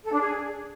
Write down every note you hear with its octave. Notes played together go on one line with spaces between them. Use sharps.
A4
D4
G#4